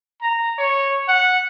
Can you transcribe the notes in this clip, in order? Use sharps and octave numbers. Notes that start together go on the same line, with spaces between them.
A#5
C#5
F#5